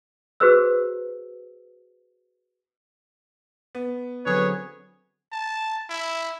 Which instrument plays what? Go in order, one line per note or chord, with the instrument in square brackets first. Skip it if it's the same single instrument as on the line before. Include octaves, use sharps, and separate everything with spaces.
[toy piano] F#4 G#4 B4 C5 E6
[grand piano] B3
[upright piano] D3 F#3 C4 [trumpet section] G#4 C#5 [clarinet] B4
[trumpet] A5
E4